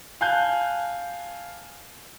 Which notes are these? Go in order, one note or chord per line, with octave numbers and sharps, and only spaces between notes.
F5 G#5 A5 F#6 G6